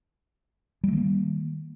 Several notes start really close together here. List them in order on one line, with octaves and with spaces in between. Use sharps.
G3 A3 D#3 A#3